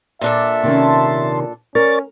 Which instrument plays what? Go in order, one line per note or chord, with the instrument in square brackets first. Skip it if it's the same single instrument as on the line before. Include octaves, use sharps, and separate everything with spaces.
[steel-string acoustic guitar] A#2 D4 A4 [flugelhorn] E5
[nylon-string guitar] C3 D#3 C#4 [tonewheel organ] A5 C6
[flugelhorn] C#4 [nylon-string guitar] A#4 [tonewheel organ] D5 C#6 A6